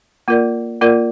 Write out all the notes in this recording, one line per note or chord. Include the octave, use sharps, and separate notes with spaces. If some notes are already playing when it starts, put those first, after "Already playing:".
A#3 F4 A#4 D5
A#3 F4 A#4 D5